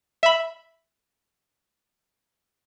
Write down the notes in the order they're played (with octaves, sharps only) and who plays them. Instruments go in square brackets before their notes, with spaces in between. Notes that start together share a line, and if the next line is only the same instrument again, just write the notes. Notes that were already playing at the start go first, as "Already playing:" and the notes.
[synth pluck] E5 B5